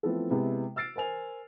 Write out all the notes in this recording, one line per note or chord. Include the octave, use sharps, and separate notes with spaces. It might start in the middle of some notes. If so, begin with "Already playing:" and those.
E3 F3 A3 B3 C4 A4
C3 G#3 B3 E4
E6 F6 A6 C7 D7
A#4 C5 G#5 F7